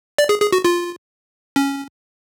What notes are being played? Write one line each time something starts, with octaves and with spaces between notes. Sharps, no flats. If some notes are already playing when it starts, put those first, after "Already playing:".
D5
G#4
G#4
F#4
F4
C#4